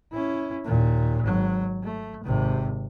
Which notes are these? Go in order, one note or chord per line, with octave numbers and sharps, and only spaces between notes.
C#4 E4
D#2 A#2
G#1 F#3
A3
G#1 C3